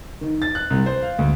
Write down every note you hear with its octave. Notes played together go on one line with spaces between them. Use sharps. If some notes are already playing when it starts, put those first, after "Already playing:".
D#3
A6
F#6
C2
C5
F5
D2